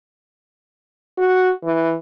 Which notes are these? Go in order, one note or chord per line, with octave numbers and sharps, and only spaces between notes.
F#4
E3